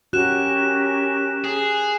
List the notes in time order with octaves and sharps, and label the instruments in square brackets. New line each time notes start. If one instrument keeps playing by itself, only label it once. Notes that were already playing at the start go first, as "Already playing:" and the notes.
[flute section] C#4 G4 A#4 [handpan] F#4 [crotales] F#6 E7
[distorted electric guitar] G#4